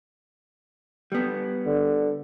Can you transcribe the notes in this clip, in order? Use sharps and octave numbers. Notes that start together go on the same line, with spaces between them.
G3 B3
D3